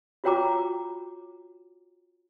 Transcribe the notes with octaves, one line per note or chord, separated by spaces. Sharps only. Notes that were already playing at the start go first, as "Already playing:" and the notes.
F4 F#4 C#5 G5 A#5 D6